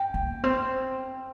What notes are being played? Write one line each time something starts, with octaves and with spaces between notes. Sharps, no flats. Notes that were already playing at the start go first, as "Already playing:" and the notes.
Already playing: G5
A#3
C4